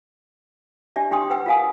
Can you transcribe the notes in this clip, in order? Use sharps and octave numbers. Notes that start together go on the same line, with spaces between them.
D4 G4 D5 E5
D4 G4 G5 C6 D#6
B4 F#5 G5 E6
F4 A#4 F5 G#5 D#6